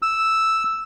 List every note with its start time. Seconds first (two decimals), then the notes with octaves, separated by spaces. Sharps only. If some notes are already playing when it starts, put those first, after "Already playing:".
0.02 E6